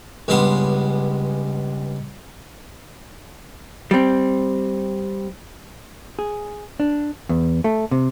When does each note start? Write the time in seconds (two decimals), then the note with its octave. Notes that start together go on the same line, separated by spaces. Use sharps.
0.28 C#2 G2 G#3 B3 C6
3.91 G3 C4
6.19 G#4
6.80 D4
7.29 E2
7.64 A3
7.91 C3